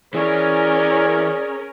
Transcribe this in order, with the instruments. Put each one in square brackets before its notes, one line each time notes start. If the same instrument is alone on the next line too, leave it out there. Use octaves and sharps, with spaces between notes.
[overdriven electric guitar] E3 [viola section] C#4 A#4 [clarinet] G#4 [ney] D5